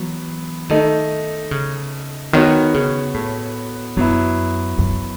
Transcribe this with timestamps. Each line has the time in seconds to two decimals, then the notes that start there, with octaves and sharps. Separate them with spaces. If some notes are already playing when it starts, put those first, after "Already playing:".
Already playing: E3 F#3 B3
0.70 D#3 A3 D#4 A4
1.51 C#3
2.33 D#3 B3 F#4 C#5
2.74 C#3
3.14 A2
3.97 F#2 F#3 B3 E4
4.79 F#2